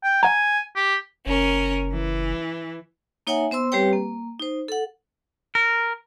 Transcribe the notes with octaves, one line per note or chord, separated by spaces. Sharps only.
G5
F#5 G#5 A#5
G4
F#1 C#4 A#4
E3
A#3 D#4 C#5 E5 F#5 G#5
B3 C5 C6 E6
G3 C4 G4 B4 C#5 G5
A#3
D#4 C5
A4 F#5
A#4